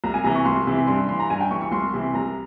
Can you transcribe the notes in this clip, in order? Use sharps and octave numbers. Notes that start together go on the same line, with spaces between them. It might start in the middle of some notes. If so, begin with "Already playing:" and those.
C2 A#5
G#5
C3 E3 A#5
C#6
C2 C6
C3 E3
G2 C6
E3 C6
A#5
G2 G#5
G5
E3 C#6
C#6
C2 C6
C3 E3
C2 A#5